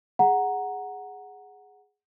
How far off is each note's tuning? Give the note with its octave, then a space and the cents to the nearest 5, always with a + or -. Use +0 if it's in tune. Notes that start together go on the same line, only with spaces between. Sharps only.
G#4 +0 F#5 +0 A#5 +5